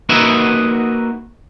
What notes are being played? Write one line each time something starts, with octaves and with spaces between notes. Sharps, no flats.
A#3 D#4 F#4 B4 D#5 E5